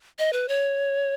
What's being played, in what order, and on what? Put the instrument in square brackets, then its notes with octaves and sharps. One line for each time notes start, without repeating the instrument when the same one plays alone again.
[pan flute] D#5
B4
C#5